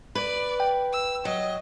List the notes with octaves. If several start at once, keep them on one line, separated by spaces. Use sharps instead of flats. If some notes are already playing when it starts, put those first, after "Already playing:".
B4 D5
G5
E6
F#3 D#5